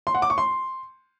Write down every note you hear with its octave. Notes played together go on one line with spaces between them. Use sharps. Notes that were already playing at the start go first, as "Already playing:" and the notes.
C6
F#5
D6
C#6
C6